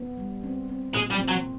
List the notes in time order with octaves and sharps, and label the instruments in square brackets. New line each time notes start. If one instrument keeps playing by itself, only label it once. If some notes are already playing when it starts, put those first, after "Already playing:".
Already playing: [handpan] B3
G3
C4
C4
[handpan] A#2 [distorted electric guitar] G#3
[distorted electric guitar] G3
[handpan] C4
[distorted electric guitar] F#3